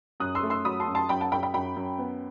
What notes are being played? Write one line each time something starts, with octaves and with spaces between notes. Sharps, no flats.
F#2 D#6 F#6
C6 E6
A3
C6 E6
F#3 B5 D#6
A5 C6
F#2
A5 C6
F#2 G5 B5
F#5 A5
F#2 G5 B5
G5 B5
F#2 G5 B5
F#2
B3